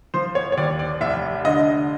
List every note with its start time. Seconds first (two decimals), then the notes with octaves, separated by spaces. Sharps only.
0.14 F3 C5
0.35 C#5
0.52 C#5
0.57 D#2 D5
0.79 D5
1.01 F1 E5
1.45 D3 D#5